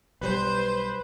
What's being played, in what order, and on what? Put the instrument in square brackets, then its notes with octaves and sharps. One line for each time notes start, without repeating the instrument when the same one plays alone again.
[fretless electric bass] B1 G3 [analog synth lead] B4 [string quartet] C5